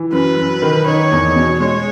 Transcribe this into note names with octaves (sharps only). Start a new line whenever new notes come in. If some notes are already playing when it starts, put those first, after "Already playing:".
Already playing: E3
F#2 B4
F#2
D#3
D#4 C#5
E2
B2
G#3 C#5